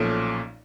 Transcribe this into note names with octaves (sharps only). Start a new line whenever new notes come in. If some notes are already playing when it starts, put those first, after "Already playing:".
Already playing: B1 A#2 F3 A3 C#4